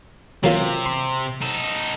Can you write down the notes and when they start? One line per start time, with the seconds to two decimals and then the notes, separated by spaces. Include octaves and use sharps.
0.44 C3 F#3 A#3 F4
0.85 C6
1.42 D#4 A4